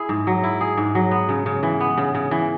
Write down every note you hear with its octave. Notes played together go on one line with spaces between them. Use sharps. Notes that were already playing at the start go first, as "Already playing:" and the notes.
Already playing: E4 G#4
G#2
F#3
E4
G#4
G#2
F#3
B3
C#3
C#3
E3
B3
C#3
C#3
E3